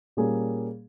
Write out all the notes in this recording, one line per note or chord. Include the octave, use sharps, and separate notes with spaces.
A#2 G3 A#3 C#4 G#4